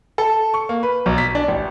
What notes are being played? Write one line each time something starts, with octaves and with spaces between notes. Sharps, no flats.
A4
C#6
A#3
B4
B1
B6
D4
A1